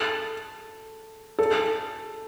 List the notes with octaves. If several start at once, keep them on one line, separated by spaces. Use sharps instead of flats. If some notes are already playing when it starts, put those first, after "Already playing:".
Already playing: A4
A4